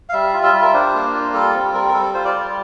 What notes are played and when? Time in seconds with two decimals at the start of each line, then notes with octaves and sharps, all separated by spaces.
0.09 F5
0.13 G3 E5
0.33 F4
0.43 E5
0.53 G3
0.62 A#4
0.73 D4 C5
0.94 A#3
1.13 F4
1.34 G3 A4
1.54 C4
1.74 G3 A#4
1.88 A#4
1.94 G3 A4
2.14 F4 C5
2.24 D5
2.34 G3